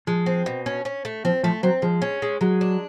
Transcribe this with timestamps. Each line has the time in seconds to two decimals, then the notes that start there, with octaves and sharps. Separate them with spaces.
0.07 F3 G#3
0.26 C4
0.46 B2
0.66 C#4
0.85 C#4
1.05 A3
1.24 F3 C4
1.43 F3 A3
1.63 F#3 C4
1.82 F3 G#3
2.02 C#4
2.22 G#3
2.41 F#3 G#3
2.61 D4